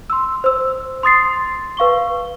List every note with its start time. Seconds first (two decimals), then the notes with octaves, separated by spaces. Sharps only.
0.10 C6 E6
0.44 C5 E6
1.03 C6 D#6 A6 C7
1.77 B4 F5 C#6 G7